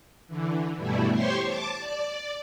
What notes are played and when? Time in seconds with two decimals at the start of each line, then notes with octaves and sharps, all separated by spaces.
0.27 D3 E3
0.76 G2 B2 E3 G3 A3 E4
1.11 G4 C5 C#5 C6 C#6
1.46 A5 D6
1.79 D5